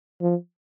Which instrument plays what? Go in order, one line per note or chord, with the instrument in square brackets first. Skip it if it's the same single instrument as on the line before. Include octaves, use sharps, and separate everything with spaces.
[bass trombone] F3